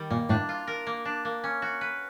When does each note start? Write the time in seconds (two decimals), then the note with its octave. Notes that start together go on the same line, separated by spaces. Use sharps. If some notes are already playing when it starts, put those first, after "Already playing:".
Already playing: D#3 G3
0.10 A#2 A#3
0.29 A2 D4
0.49 F4
0.67 A#4
0.87 A#3
1.05 D4
1.25 A#3
1.44 C#4
1.62 F#4
1.81 B4